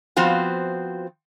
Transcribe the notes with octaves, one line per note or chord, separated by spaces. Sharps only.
F3 B3 C4 F4 F#4